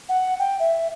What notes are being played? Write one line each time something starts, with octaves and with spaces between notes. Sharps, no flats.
F#5
G5
E5